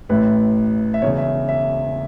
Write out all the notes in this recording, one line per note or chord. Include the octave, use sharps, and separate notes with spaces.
A1 A2 A3 E4 B4
E5
E1 E2 C#3 C#5
E5
E5